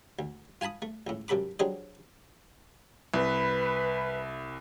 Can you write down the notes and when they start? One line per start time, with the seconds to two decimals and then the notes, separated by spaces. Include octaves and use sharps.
0.19 D2
0.61 F4 G#5 A5 B5 D#6
0.82 A3
1.07 C#2 A2
1.28 F#2 C3 A4 B5 D6
1.59 F#3 G3 C4 D4 G#4 C5
3.14 C2 B4